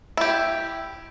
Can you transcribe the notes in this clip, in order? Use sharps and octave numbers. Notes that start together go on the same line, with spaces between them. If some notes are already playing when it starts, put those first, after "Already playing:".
E4 G4